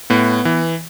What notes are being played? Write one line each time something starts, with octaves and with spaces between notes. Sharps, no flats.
A2 B3
E3